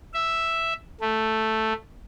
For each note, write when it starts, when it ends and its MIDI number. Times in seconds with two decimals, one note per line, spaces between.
0.14 0.73 76
1.01 1.73 57